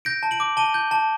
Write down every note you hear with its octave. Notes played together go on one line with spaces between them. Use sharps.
G6 A#6 D7
A5
D7 F#7
D6
A5 D#7 G7
G6
A5